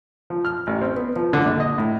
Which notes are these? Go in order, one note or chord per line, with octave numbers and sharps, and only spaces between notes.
F3
F6
A1
C4
B3
F3
D3
A#1
D#5
A2